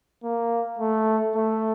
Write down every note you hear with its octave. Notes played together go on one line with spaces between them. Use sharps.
A#3
A3
A3